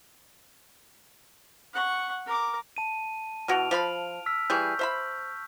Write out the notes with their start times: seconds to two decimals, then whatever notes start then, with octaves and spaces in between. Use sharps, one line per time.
1.74 F#5 C#6
2.26 A#4 D6
2.76 A5 D#7
3.48 B2 E3 F#4 F6 D7 F7
3.71 F3 F5 B5
4.26 E6 F6 B6
4.50 E3 G3 G#4 C#6 F6 G6
4.79 C5 E5 B5